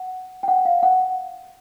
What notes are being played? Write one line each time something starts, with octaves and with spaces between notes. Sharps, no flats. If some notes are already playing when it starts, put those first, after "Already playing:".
Already playing: F#5
G5
F#5
F5
F#5